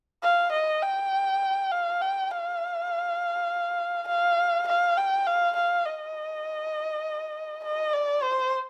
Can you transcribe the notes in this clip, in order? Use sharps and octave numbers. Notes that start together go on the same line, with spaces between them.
F5
D#5
G5
F5
G5
F5
F5
F5
G5
F5
F5
D#5
D#5
D5
C5